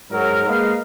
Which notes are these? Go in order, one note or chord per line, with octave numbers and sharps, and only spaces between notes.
G#2 F#3 A#4
G#3 A#3 A#4 B4 D#5 F5